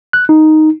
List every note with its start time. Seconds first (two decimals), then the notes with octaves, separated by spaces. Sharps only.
0.13 F#6
0.29 D#4